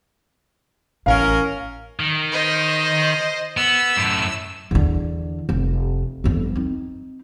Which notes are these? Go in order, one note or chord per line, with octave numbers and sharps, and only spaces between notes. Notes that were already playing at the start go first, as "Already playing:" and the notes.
A1 C#4 A#4 F5
D#3
C5 D#5
B3 E6
F#2 A2
E2 D3
F1
G1 F2
C4 D#4